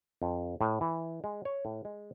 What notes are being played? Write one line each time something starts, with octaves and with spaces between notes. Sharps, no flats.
F2
A2
E3
G#3
C#5
A2
G#3